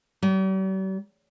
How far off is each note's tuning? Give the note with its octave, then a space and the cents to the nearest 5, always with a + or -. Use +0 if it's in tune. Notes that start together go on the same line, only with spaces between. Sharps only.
G3 -45